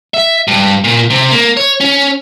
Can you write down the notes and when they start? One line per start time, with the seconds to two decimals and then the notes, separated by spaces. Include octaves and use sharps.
0.14 E5
0.48 G2
0.84 A#2
1.10 C3
1.31 A#3
1.57 C#5
1.80 C#4